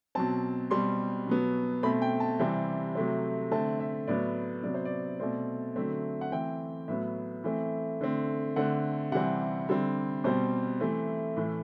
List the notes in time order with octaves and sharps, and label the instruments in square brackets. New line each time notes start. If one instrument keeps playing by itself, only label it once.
[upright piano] B2 F#3 C4 A5
B2 G3 C4 C6
B2 F#3 B3
B2 A3 C4 B5
G5
A5
C3 E3 G3 C4
C3 F#3 A3 C4
D3 A3 C4 A5
E5
A2 F#3 B3 D5
C3 F#3 B3 D5
C5
D5
B2 A3 C4 D5
D3 F#3 A3 C4 E5
F#5
E3 A3 C4 G5
A2 F#3 B3 E5
E3 A3 C4
D3 A3 C4
D3 A3 C4 F#5
C3 E3 G3 C4 F#5
D3 G3 C4 E5
B2 G3 C4 C5
E3 A3 C4
A2 E3 A3